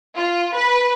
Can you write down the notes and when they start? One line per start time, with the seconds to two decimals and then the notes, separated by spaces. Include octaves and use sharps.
0.16 F4
0.54 B4